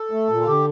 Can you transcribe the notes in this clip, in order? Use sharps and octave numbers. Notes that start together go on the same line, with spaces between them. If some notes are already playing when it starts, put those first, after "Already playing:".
Already playing: A4
A3
A#2
F4
D3 G4